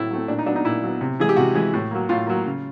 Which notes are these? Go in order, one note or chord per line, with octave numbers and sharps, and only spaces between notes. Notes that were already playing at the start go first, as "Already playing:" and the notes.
Already playing: A2 F#3 A3 C4 E4
F#3 A3 C4
A#2 D4
D#4
F#3 B3 D4
D#4
A#2 E4
F#3 B3
C3
E3 G#3 G#4
G4
C3 F#4
E3 G#3
A2
F#3 A#3
A2 F4
F#3 A#3
C#3